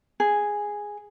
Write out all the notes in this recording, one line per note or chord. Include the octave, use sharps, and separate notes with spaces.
G#4